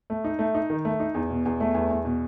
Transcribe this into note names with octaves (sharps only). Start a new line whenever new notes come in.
A3
D#4
A3
D#4
D#3
A3
D#4
E2
B2
E2
A3
E2
E2
B2